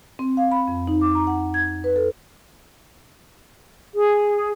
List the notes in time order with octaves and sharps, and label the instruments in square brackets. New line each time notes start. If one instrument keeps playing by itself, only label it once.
[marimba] C4
F5
B5
F2
D#4
D6
A#5
F#5
G#6
B4
A4
[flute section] G#4